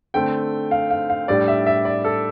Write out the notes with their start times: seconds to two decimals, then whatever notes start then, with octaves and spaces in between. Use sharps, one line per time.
0.14 D3 A3 C4 G5
0.71 F5
0.91 F5
1.10 F5
1.28 A2 G3 D4 D5
1.48 E5
1.66 E5
1.85 D5
2.04 A4